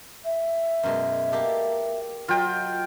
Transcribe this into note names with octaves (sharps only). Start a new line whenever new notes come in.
E5
F#2 B2 G#3
A#3 G4 A4
F#3 F4 D#5 G5